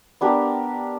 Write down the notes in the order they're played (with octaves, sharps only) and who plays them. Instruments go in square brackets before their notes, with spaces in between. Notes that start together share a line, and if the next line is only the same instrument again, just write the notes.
[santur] B3 D4 G4 A#4